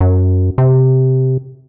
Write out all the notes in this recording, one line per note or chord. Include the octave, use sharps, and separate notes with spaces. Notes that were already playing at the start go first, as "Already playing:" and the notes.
F#2
C3